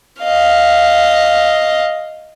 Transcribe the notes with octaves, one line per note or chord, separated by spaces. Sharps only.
D#5 F5